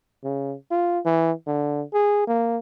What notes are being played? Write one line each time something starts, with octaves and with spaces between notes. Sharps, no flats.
C#3
F4
E3
D3
G#4
A#3